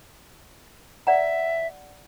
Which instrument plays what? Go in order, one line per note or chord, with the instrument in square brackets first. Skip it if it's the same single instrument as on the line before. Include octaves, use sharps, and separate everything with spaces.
[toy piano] D5 F#5 A#5 [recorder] E5